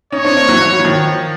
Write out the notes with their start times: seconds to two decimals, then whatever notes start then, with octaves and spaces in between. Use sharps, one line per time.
0.12 C#4 D#4 C#5
0.24 C4 D4
0.37 A#3 C4
0.49 E3 F#3
0.60 E3 F#3
0.80 F#3
0.85 D#3 F3